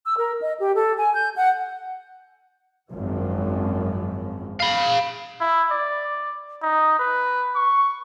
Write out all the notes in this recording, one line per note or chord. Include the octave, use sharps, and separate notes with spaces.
E6
A#4
D#5
G4
A4
G#5
G6
F#5
G#1 F#2 F3
F5 B5
E4
D5
D#4
B4
C#6